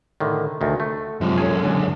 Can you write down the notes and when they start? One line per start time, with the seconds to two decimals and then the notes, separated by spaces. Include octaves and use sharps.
0.20 A2 D3 D#3
0.61 D2 D#3
0.80 A3
1.21 C#2 F#2 C3 F3 G#3
1.38 C#4 G#4 A4 C#5
1.64 D3 G#3